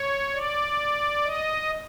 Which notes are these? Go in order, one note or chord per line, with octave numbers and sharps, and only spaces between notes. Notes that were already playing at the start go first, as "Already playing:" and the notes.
Already playing: C#5
D5
D#5